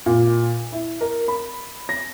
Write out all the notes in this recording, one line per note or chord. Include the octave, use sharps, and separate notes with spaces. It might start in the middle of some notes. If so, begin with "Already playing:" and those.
A#2
E4
A#4
B5
A#6